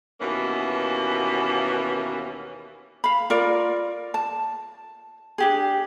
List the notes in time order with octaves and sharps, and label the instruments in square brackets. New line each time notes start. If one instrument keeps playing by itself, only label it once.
[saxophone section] D#2 B2 E3 A#3 C#4
[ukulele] F5 B5
F4 A#4 D5
A5
D4 G4 G#4